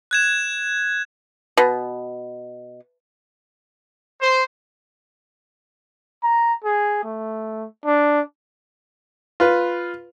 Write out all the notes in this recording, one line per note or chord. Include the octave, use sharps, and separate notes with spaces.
F#6 G#6 E7
B2
C5
A#5
G#4
A3
D4
F4 B4